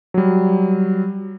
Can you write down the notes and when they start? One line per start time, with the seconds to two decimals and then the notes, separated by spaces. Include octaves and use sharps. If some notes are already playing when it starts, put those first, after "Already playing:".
0.14 F#3 G3